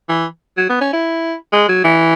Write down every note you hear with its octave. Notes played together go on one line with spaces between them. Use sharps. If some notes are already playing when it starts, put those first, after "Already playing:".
E3
F#3
B3
C#4
E4
G#3
F#3
E3